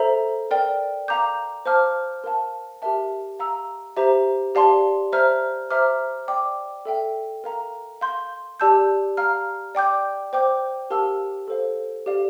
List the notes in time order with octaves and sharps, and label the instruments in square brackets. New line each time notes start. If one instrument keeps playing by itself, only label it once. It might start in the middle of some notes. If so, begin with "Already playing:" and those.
Already playing: [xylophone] A4 C5 E5 A#5
A#4 D5 G5
F5 A#5 D6 G6
C5 F5 A5 D6 F6
A#4 F5 A5
G4 A#4 E5 A5
F5 A#5 E6
G4 C5 E5 A#5
G4 D5 F5 A5 C6
C5 E5 A#5 F6
C5 E5 A#5 D6 F6
D5 G5 D6
A4 E5 G5
A#4 F5 A#5
F5 C6 G6
G4 D5 A5 E6 G6
F5 A#5 F6
D5 G5 D6 G6
C5 G5 D6 G6
G4 A#4 F5 A5 E6
A4 C5 F5
G4 D5 F5